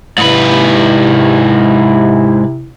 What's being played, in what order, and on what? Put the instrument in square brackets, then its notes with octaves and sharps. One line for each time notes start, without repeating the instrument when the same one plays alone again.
[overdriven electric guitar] G#2 B4 [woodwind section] C3 E4